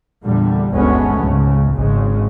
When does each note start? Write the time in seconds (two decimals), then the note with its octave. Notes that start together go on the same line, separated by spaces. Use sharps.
0.24 E2 A#2 D3 G3
0.70 G1 D2 G#3 A3 B3 C#4
1.19 C#2 G#2 C#3
1.75 G#1 C#3 G#3